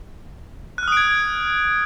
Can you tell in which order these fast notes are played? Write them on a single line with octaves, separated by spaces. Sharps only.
F#6 F6 D#6 D7 G#6